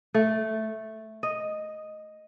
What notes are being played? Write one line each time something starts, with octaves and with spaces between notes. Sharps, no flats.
A3
D#5